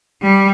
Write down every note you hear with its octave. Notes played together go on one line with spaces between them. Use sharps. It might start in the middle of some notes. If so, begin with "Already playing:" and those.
G3